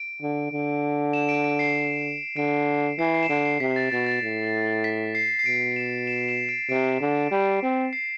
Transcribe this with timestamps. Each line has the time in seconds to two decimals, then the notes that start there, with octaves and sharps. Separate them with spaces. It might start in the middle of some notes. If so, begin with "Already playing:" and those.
Already playing: D7
0.22 D3
0.51 D3
1.13 E7
1.29 D7
1.44 D7
1.59 C7
2.37 D3 D7
2.98 E3 C7
3.14 C7
3.23 E7
3.29 D3 D7
3.45 C7
3.60 C3 B6
3.76 A6
3.92 B2 A6
4.07 A6
4.22 A2
4.84 B6
5.15 C7
5.39 C7
5.46 B2 D7
5.76 E7
6.07 E7
6.29 E7
6.49 D7
6.69 C3 D7
7.00 D3
7.31 G3
7.62 C4
7.93 C7